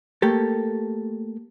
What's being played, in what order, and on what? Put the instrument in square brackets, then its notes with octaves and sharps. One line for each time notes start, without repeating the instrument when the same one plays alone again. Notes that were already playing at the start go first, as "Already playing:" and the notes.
[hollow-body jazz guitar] A3 A#3 G4 A4